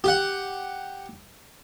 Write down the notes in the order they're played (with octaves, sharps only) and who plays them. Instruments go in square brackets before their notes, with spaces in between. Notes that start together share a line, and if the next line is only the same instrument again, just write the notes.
[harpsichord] G4 F#5